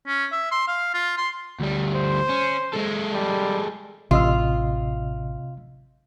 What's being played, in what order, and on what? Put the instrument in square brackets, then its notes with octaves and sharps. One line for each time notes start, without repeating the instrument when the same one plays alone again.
[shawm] C#4
E5
C6
F5
F4
C6
[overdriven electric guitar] D2 G3
[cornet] C5
[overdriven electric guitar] C#4
G#3 A4
[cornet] G3
[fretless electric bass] A1 [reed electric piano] C3 D#5 E6 [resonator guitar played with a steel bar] F4